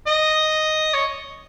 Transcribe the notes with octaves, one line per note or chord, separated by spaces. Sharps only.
D#5
C#5